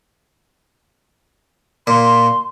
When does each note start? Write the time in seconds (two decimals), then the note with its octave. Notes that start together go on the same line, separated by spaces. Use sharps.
1.87 A#2 C6